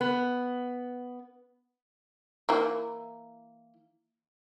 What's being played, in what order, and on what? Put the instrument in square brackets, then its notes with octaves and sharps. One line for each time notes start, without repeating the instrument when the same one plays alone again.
[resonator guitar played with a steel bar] B3
[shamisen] E3 A#3